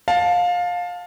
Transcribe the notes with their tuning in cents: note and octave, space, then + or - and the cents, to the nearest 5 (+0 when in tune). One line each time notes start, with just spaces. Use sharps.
F5 +20 A5 +0